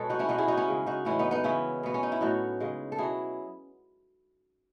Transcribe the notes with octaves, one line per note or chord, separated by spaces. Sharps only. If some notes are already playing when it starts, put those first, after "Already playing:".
Already playing: B2 G#3 A4 B4 C#5 D#5
D#4 F#4
C#4 E4
B2 F#3 D#4 F#4
E4 G#4
D#4 F#4
C#4 E4
C#3 G#3
D#4 F#4
A2 E3 G#3 C#4 E4
B3 D#4
B3 D#4
C#3 E3 G#3 C#4 E4
B2 F#3 B3
C#4
D#4
E4
A2 F#3 D#4 F#4
C#3 G#3
A4
B2 F#3 E4 G#4